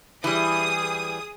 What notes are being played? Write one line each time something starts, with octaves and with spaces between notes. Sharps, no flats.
E3 G3 G#4 D#6